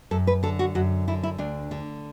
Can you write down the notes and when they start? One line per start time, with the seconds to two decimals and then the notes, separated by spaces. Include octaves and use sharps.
0.11 F#2 A4
0.27 B4
0.43 D3 A4
0.59 F#4
0.75 F#2 F#4
1.08 D3 E4
1.23 E4
1.38 D2 D4
1.71 D3